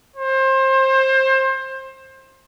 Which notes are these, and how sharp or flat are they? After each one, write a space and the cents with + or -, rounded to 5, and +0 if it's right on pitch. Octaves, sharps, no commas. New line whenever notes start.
C5 +25